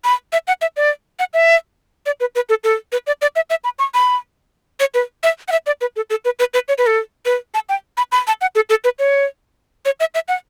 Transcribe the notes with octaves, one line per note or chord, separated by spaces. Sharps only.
B5
E5
F#5
E5
D5
F#5
E5
D5
B4
B4
A4
A4
B4
D5
D5
E5
E5
B5
C#6
B5
C#5
B4
E5
F#5
E5
D5
B4
A4
A4
B4
B4
B4
C#5
B4
A4
B4
A5
G5
B5
B5
A5
F#5
A4
A4
B4
C#5
C#5
E5
E5
F#5